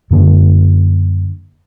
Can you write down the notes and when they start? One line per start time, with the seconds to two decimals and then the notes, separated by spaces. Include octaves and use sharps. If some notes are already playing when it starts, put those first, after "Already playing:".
0.11 F#2 D3 A#3